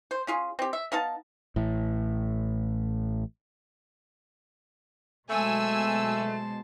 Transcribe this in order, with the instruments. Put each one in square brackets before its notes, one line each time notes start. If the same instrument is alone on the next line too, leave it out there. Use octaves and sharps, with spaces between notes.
[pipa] C5
C#4 F4 G#4
C4 G4
E5
B3 D#4 F5 A5
[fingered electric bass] A1 A2
[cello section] B2 F#3 G#3 [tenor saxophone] A3 [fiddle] C5 A5 [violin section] G#5 E6